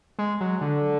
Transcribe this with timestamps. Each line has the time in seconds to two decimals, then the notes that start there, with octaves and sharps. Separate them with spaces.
0.19 G#3
0.41 F#3
0.61 D3